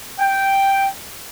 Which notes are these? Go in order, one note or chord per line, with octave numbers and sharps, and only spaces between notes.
G5